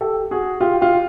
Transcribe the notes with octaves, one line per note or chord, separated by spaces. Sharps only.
G4 A4
F#4 G#4
F4 G4
F4 G4